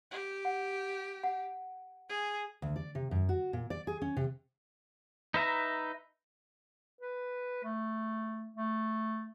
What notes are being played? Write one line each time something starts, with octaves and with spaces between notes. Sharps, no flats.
G4
F#5
F#5
G#4
D2
D5
C3
F#2
F#4
A#2
D5
G#4
C#4
C3
D#4 B4 E5 A#5
B4
A3
A3